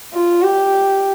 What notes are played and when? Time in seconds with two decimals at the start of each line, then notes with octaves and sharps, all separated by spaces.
0.14 F4
0.42 G4